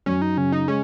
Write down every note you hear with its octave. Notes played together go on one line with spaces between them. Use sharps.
F#2 C#4
D#4
C#3 C#4
D#4
G#3 C#4